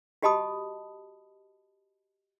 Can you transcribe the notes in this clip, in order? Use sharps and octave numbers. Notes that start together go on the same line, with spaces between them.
F#4 G4 D#5 A5 B5 D#6